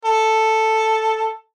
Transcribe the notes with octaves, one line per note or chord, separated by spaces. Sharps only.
A4